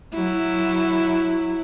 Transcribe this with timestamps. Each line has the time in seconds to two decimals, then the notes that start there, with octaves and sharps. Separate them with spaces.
0.13 F#3 E4